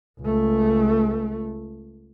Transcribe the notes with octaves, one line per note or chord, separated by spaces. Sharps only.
C#2 A3